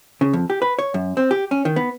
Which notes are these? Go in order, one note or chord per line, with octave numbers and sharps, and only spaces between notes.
C#3
F2
G4
B4
C#5
F#2
C4
G4
C#4
D#3
B3